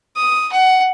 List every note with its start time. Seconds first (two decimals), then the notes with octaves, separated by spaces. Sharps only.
0.16 D#6
0.52 F#5